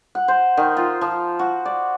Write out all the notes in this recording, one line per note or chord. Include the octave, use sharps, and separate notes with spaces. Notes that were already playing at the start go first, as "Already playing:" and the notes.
F#5
C5
D#3
F4
F3
F#4
D5